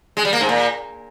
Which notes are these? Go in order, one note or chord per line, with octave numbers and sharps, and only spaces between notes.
G#3
G3
A#3
G#2
A#2